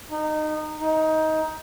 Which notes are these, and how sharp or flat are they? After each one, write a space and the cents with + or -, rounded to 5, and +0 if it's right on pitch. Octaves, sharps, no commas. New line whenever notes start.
D#4 -20
D#4 +20